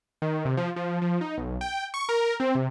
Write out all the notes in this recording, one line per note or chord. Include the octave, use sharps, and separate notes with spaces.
D#3
C3
F3
F3
F3
D#4
B1
G5
C#6
A#4
C4
C3